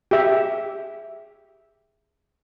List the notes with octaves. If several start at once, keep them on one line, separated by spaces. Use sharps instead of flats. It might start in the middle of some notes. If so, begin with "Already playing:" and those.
G4 G#4 E5